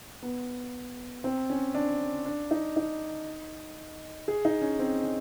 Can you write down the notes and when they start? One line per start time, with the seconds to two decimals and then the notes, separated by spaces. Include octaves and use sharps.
0.23 B3
1.24 C4
1.50 C#4
1.75 D4
2.25 D4
2.51 D#4
2.77 D#4
4.28 G#4
4.45 D#4
4.62 C#4
4.79 C4
5.04 C#4